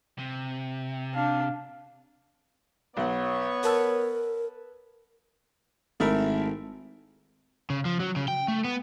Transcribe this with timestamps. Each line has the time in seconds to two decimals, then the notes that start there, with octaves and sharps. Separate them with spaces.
0.18 C3
1.14 D4 F5
2.97 B1 B3 C#5 F#5
3.63 A#4 B4 A5 E6
6.00 G#1 A3 E4 A#4
7.70 C#3
7.85 F3
8.00 F#3
8.16 C#3
8.28 G5
8.48 A3
8.65 B3